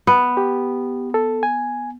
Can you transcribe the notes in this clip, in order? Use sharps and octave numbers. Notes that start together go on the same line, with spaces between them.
B3
G4
A4
G#5